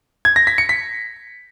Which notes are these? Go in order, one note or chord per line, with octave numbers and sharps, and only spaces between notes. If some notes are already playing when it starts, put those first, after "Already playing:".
G#6
A#6
B6
C#7
B6